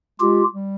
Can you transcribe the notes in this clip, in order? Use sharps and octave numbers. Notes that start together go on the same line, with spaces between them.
G#3 F4 G4
G3